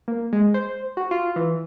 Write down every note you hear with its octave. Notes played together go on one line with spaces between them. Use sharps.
A#3
G#3
C5
F#4
F4
E3